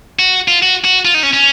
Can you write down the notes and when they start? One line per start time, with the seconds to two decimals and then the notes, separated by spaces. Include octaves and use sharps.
0.19 F#4
0.48 F4
0.62 F#4
0.84 F#4
1.05 F4
1.14 D#4
1.23 C#4
1.33 C#4